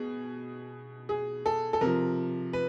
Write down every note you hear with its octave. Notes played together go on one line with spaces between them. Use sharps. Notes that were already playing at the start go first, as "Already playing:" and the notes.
Already playing: B2 G#4
G#4
A4
A4
C3 F3 A#4
B4